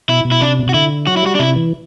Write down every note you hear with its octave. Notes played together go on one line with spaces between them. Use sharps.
B2 E4
B2
E4
C3 D4
B2
C3
F#4
D3 E4
F#3 F#4
E4
G3 F#4
D4
C3 E4
E3